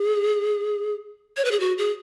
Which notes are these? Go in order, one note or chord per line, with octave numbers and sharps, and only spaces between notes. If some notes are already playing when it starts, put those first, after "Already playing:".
Already playing: G#4
C#5
B4
G#4
F#4
G#4